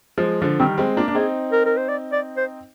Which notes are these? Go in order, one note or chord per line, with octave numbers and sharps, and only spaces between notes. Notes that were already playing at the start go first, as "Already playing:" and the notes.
F3 G#3
D3 F3
D#3 G3 C4
G#3 C4
A#3 D4 F4
D4
C4 D#4 G#4
A#4
A#4
C5
D5
D5
C5